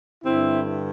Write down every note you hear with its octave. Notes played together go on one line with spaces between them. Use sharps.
G2 D3 C4 E4